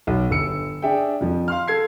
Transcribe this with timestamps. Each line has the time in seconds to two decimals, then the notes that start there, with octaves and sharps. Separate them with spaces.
0.07 B1
0.31 G1 E6 C#7
0.82 D4 G#4 E5 G5
1.21 F2 F3
1.48 F5 C6 F6
1.68 A4 G#6 C7